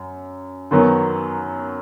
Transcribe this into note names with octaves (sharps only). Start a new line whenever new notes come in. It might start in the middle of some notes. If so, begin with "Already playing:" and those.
Already playing: F#2
F#2 D#3 F#3 B3